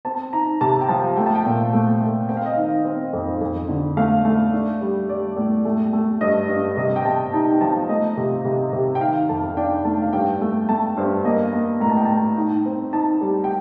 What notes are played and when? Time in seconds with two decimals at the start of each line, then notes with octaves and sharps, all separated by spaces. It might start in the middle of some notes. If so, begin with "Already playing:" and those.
0.05 C4 A5
0.33 D#4 A#5
0.61 C3 A5
0.81 G5
0.89 F3 A5
1.17 A3 G5
1.26 A5
1.35 G5
1.45 A#2
1.73 A3
2.00 A3
2.29 C4 G5
2.37 F5
2.46 D#5
2.53 D#3 F5
2.85 C4
3.13 F2
3.41 F2
3.69 D3
3.97 A3 F5
4.25 A3
4.53 D4
4.81 G3
5.09 G3 D5
5.37 A2
5.65 A3
5.93 A3
6.21 G2 D#5
6.49 G2
6.77 C3 D#5
6.96 G5
7.05 C3 A5
7.33 D#4 A5
7.51 G5
7.61 F3 A5
7.89 A3 D#5
8.17 C3
8.45 C3
8.73 C3
8.95 G5
9.01 D#3 F5
9.29 F2 A5
9.49 F5
9.57 D4 G5
9.85 A3 A5
10.02 F5
10.13 G2 G5
10.41 A3
10.69 A3 A5
10.97 G2 C5
11.25 A#3 D#5
11.53 A#3
11.80 A2 A#5
11.90 A5
11.97 G5
12.05 A2 A5
12.37 D#4
12.66 C4
12.93 D#4 A5
13.21 G3
13.44 G5